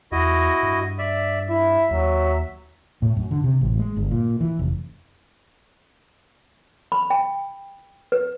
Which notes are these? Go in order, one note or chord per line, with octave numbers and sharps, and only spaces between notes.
E2 E4 F#4 D#5
G2
D5 E5
E4 E5
D#2 F#3
A2
F#2
D3
C3
A1
G#3
G1
A#2
E3
F1
B5
G5
B4